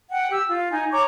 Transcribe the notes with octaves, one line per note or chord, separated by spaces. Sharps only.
F#5 G5
G4 E6
F4
D#4 G#5
C#5 A#5 C#6 D6